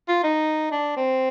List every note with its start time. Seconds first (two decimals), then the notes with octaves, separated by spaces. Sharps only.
0.09 F4
0.24 D#4
0.72 D4
0.97 C4